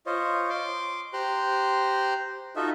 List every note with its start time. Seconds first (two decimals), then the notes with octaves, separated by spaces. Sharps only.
0.06 F4 C5 C#5 D#5
0.50 C6 D6
1.13 G4 C5 A#5 C6 F#6
2.56 D#4 F4 F#4 A4 D#5 E5